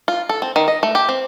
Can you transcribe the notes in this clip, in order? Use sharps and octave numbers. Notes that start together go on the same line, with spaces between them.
F4
A4
C4
D#3
D#5
A3
G4
C4